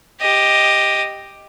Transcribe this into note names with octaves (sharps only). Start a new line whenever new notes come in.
G4 D#5